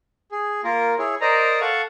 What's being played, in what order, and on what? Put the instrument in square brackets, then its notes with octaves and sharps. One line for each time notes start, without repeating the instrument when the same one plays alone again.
[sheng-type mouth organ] G#4
A#3 F4 A#4
E4 G#4 C#5
A#4 C5 D5 D#5 A#5
A4 F5 F#5 C#6